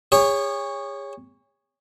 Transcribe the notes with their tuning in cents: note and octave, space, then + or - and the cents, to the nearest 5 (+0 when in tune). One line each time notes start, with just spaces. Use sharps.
G#4 -40 C#5 +0